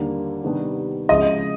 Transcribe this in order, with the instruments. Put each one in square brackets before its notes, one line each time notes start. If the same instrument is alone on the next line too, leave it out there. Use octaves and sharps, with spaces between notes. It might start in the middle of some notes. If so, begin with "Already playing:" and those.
Already playing: [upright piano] D#2 D3 G3 A#3
C3 D#3 G3 B3 D4
[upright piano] C#3 F3 G#3 [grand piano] D#5